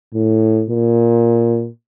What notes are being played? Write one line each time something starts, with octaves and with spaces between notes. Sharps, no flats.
A2
A#2